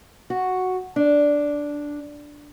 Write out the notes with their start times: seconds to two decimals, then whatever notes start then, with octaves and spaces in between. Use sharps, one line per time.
0.30 F#4
0.96 D4